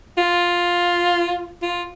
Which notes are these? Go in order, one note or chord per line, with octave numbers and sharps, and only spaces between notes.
F4
F4